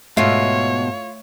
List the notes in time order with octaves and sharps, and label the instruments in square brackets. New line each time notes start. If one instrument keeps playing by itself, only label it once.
[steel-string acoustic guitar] G#2 B2 [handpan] A3 E5 F5 [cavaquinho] F4 [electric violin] C#5